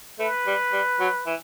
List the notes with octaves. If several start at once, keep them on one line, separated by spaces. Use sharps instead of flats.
A3 B4
G3
G3
F#3
E3